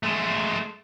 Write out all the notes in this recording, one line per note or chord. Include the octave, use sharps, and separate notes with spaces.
G#3 A3